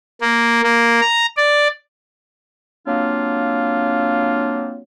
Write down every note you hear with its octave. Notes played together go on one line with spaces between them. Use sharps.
A#3
A#3
A#5
D5
F#3 A#3 C4 D4 F4